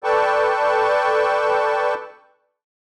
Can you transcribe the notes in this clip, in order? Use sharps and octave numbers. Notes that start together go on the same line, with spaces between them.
A4 B4 D5 G5 A5 C#6